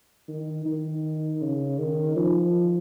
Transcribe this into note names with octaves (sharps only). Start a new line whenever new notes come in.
D#3
D#3
C#3
D#3
F3